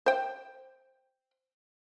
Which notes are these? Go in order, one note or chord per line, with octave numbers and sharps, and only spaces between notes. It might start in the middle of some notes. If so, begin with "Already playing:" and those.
C5 G5